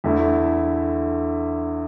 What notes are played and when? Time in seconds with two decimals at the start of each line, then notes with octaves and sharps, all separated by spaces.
0.04 E2 D3 A3 E4